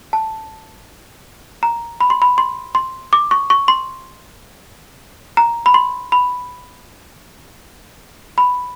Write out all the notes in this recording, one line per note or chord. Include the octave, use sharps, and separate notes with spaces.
A5
A#5
B5
C6
B5
C6
C6
D6
C#6
C#6
C6
A#5
B5
C6
B5
B5